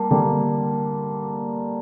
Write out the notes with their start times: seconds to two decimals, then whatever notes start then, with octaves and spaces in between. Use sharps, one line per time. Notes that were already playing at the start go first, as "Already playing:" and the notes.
Already playing: G3 A#3 A5
0.10 D3 G3 A#3